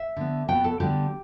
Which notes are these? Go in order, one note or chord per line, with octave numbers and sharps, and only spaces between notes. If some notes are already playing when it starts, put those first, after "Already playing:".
Already playing: E5
D3 B3
B2 B3 G5
A4
D3 G3 B3 G4